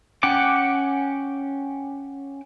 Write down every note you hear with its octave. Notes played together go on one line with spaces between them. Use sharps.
C#4 F#5 G5 D6